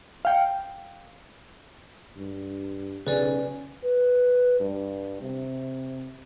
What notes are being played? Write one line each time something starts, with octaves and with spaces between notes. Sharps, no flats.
F5 G5
G2
B1 C#3 B4 D5 G#5
B4
G2
C3